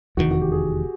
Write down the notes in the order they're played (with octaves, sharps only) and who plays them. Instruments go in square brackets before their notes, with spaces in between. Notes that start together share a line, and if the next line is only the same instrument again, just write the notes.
[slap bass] F1 E2 C3 D#3 [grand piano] F#4
[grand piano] F#4
G4
G#4